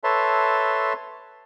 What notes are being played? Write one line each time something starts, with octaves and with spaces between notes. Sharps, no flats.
A4 B4 C#5 E5 A5 C6